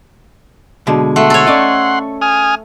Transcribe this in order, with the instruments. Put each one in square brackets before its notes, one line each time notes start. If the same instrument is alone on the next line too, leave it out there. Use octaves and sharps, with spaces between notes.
[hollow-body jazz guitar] B2 D3 G#3
[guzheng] A3 [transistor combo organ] F#5 C6
[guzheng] A4 C#5
[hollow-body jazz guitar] C#4 D5 D#5
[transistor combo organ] G#5 D#6 F6